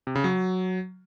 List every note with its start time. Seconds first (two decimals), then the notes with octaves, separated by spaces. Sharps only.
0.07 C3
0.15 C#3
0.24 F#3